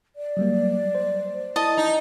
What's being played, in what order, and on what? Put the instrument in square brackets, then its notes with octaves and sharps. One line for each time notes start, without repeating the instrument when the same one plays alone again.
[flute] D5
[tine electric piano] F#3 G3 A#3
C5
[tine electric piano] E4 [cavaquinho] D#5 A5
[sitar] D#4